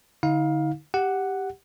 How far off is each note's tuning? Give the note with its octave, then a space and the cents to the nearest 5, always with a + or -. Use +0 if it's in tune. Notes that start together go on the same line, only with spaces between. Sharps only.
D3 +0 D#4 +45 F5 +20
G4 +0 F#5 +5